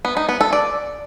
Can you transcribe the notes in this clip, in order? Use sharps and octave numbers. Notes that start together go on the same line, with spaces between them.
B3
D#4
B3
A4
D5